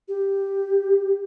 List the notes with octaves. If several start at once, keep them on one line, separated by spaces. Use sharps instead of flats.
G4